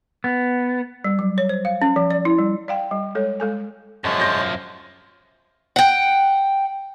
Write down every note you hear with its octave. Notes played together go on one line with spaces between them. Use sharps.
B3
G3
F#3
C#5
C5
F5
C#4
F3
D5
E4
G3
D5 F5 G5
G3
G#3 A4 C#5
G#3 A4 G#5
F#2 F3 G#3 C#5 A5
C6 G6 A#6
F#5 G5